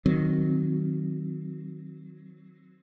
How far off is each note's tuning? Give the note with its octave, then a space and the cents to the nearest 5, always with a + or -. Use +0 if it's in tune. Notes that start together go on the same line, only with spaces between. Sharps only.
D#3 -5 F#3 +0 C4 +0